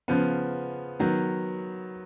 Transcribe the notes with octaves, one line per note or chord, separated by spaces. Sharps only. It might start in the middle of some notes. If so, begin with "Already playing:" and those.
C#3 F3 B3
D#3 F#3 B3